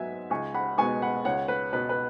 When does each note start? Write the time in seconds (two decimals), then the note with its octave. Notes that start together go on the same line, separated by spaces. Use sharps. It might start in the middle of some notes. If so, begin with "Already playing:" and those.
Already playing: G#2 F#3 B3 E5 G#5
0.30 C#2 G#5 C#6
0.54 F#5 B5
0.78 B2 G#3 B3 G#5 C#6
1.02 F#5 B5
1.25 C#2 C#5 F#5
1.48 B4
1.73 B2 B3 B4
1.89 B4